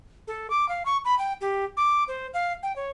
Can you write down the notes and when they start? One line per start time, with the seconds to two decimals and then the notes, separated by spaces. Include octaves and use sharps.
0.27 A4
0.50 D6
0.69 F5
0.86 C#6
1.05 B5
1.19 G5
1.41 G4
1.77 D6
2.08 C5
2.34 F5
2.63 G5
2.76 C#5